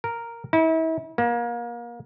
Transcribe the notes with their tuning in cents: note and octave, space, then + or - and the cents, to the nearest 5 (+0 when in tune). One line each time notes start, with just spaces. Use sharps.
A#4 -5
E4 -35
A#3 +30